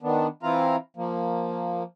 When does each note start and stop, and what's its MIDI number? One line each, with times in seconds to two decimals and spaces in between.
0.02 0.27 51
0.02 0.27 59
0.02 0.27 62
0.43 0.76 52
0.43 0.76 60
0.43 0.76 64
0.43 0.76 65
0.43 0.76 77
0.43 0.76 82
0.97 1.83 53
0.97 1.83 58